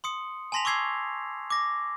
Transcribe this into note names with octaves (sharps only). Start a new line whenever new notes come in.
C6 D#6 C#7
G#5 A5 C6 A#6 B6 F7
C#6 D6 E6 G#6 C7
D6 A#6